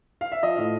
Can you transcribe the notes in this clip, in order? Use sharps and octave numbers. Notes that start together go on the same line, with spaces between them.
F5
E5
F3 D#5
A2 F5